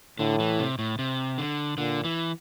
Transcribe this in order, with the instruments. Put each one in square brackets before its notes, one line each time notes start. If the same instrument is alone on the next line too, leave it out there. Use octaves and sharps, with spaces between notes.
[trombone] A2 [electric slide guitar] D3
[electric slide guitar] E3
C3
A2
C3
D3
[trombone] A#2 [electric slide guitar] D3
[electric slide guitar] E3